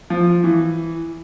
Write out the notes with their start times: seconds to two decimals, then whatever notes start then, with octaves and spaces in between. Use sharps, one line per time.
0.10 F3
0.44 E3